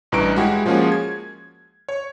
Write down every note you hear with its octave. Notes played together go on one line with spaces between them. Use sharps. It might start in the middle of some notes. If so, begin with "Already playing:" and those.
A1 G2 E3 A#5 C#6 D7
G#3 E4 F#4 G4
F3 G#3 A#3 C#4 F#4 G#4
G#6
C#5